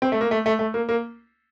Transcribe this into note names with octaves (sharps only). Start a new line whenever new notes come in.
C4
A3
A#3
A3
A3
A3
A#3
A#3